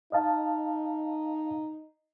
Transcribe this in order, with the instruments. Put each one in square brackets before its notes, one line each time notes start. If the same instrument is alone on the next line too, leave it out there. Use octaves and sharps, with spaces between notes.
[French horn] D#4 [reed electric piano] D#5 F5 A5